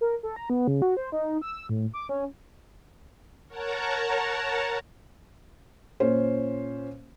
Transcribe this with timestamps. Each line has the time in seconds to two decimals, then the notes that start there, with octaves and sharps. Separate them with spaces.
0.01 A#4
0.23 A4
0.36 A#5
0.50 B3
0.68 C#3
0.82 F#4
0.97 C5
1.12 D#4
1.42 E6
1.69 A2
1.94 D6
2.09 C#4
3.48 A#4 C#5 F#5 A5 A#5
6.00 A#2 C#4 C5